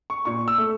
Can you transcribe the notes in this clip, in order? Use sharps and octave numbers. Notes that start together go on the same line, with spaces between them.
C#6
A#2 C#6
E6
A3